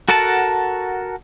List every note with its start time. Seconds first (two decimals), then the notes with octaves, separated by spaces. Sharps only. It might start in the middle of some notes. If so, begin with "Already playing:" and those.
0.09 F#4 A4 A#4 F#5 A5